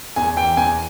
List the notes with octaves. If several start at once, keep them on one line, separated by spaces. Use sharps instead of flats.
E2 G#5
E3 G5
E2 G#5